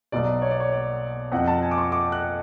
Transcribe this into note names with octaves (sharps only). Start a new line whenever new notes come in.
B1 B2 F#3 D5
C#5
D5
C#5
D5
F2 F3 F#5
A5
G#5
D6
C#6
D6
F#6